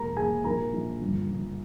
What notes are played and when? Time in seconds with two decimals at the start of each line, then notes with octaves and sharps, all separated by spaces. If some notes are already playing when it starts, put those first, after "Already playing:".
Already playing: E1 A#3 A#4 A#5
0.16 A#3 G#4 G#5
0.44 A#1 A#4 A#5
0.73 A#1
1.01 G1
1.30 G1